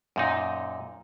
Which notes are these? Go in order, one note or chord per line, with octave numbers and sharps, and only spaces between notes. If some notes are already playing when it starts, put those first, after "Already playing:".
F#2 A#2 D#4